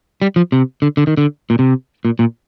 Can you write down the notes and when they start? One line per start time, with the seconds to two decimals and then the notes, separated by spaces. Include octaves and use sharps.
0.22 G3
0.36 F3
0.52 C3
0.82 D3
0.97 D3
1.07 D#3
1.17 D3
1.50 A#2
1.59 C3
2.05 A#2
2.19 A#2